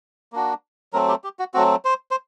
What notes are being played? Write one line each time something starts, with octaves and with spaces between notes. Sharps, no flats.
A#3 D4 F#4
F#3 A3 C4 A#4
G4
G4
F#4
F#3 A3 C4 F#4
C5
C5